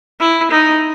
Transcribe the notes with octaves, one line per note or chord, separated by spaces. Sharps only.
E4
D#4